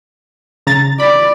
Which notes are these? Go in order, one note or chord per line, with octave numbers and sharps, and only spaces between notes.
C#3 A#5 A6
D5 B5